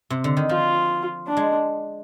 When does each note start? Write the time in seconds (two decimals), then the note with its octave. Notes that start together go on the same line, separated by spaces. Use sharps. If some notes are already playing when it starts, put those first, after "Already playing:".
0.10 C3
0.24 D3
0.37 D#3
0.49 F3 F4
1.28 D4
1.37 G#3